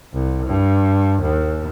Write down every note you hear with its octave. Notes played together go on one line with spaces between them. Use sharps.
C2
G2
D#2